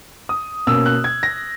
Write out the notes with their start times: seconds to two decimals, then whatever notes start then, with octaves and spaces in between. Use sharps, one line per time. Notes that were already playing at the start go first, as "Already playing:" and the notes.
0.29 D#6
0.67 B2 A#3 C#4 E6
0.86 F#6
1.04 G#6
1.23 A#6